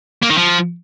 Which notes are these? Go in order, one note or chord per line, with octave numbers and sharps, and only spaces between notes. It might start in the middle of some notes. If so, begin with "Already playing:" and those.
A#3
D#3
F3